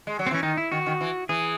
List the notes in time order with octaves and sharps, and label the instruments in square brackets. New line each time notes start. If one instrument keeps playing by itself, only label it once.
[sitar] G#3
F#3
[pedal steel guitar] C4
[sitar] E3 [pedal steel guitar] C#4
[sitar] D#3 [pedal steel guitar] D#4
[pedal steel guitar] E4
[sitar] D#3 [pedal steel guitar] F#4
[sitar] D#3
E3
[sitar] E3 [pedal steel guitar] G#4